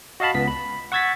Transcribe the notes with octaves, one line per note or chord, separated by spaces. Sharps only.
F#4 D#5 F5 A5 B5
C#2 B3 B6
B5
F#5 C#6 E6 G#6 A6 B6